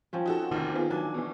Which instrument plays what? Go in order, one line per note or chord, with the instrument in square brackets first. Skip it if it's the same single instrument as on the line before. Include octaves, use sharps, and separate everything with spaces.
[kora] F3 C4 C#4
[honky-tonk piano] D#4 F#4 A4
[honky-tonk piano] D2 C3 [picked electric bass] D#3
[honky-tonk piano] B3 F4 G#4
[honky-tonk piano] F#3 G#5 [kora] D4
[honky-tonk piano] B2 E3